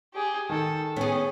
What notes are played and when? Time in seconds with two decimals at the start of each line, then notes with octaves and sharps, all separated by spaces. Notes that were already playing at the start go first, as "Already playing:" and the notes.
0.14 G4 G#4
0.49 D#3 A4
0.96 B3 C#4 G#4